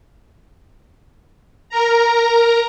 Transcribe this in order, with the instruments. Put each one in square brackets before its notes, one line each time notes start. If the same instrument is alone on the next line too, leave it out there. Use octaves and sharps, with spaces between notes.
[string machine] A#4 A#5